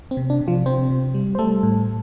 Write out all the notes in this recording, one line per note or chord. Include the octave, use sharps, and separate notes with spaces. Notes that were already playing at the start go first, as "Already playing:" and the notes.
C4
C3
D4
C3
F3 F4
C3 C4 C5
C3
G3
C5
G3 A3 A4
A2